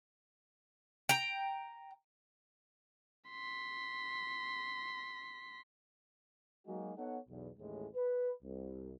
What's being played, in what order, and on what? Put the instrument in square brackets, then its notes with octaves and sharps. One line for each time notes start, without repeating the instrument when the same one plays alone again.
[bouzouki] G5 A#5
[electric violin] C6 B6
[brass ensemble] F#3 G#3 A#3 D#4 F#4 G#4
B3 D#4 A4 C#5 F#5
B1 E2 B2
A1 D#2 A2 G#3
B4
C2